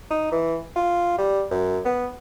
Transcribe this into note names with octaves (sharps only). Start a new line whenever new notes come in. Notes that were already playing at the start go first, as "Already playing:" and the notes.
D#4
E3
F4
G3
F#2
B3